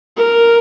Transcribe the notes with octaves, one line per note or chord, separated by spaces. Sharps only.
A#4